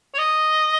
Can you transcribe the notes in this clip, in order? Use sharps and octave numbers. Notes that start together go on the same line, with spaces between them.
C#5
D#5